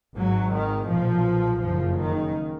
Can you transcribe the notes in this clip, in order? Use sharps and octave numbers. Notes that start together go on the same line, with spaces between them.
G#1 G#2 F#3
D#3
B1 A#2 F3
F#1 F2 C#3 F3
D#3